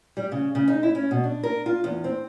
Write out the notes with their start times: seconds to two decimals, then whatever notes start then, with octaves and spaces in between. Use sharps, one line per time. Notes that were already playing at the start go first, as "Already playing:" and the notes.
0.17 G3
0.32 C#3
0.55 C#3
0.68 D#4
0.83 E4
0.95 C#4
1.11 B2
1.24 D4
1.43 A#4
1.66 F4
1.84 E2
2.04 C4